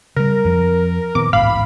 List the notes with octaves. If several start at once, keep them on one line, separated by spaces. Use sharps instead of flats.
C#3 G3 A#4
F2 F3
A#2 D#3 B3 D6
A1 D2 G#2 F5 B5